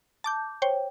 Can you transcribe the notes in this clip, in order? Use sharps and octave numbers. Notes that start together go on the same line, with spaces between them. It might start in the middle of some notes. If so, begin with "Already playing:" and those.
A5 D6 G6
C5 C#5 G5